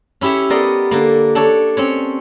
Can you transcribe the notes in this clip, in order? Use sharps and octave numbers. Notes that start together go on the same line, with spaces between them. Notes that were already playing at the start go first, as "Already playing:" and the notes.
C#4 E4 G4 C#5 E5
B3 A#4 D5 D#5 C6
D3 A#3
D4 A4 C#5
C4 C#4 C#5